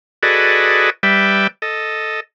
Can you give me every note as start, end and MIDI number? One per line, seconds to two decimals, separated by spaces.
0.23 0.90 66
0.23 0.90 68
0.23 0.90 69
0.23 0.90 71
0.23 0.90 74
0.23 0.90 75
1.03 1.47 55
1.03 1.47 71
1.03 1.47 74
1.03 1.47 76
1.03 1.47 79
1.62 2.20 69
1.62 2.20 75